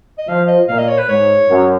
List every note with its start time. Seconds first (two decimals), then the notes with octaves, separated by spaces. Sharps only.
0.18 D#5
0.28 F3 F5
0.47 D#5
0.68 A#2 F5
0.78 D#5
0.88 C#5
0.98 B4
1.08 G#2 C#5
1.48 F#2